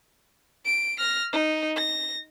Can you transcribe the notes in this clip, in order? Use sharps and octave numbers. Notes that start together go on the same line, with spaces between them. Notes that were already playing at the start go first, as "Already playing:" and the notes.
D7
F6 A#6
D#4
A#6